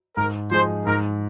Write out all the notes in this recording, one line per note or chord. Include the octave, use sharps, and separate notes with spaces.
G#2 A#4
F3 G#3 D#4 G#4 C5
G#2 A#4